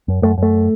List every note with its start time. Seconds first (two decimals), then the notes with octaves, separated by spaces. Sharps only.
0.08 F#2
0.22 F#2 A3
0.38 F#2 A3